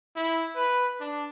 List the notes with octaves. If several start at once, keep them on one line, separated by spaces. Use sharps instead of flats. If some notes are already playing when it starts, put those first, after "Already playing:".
E4
B4
D4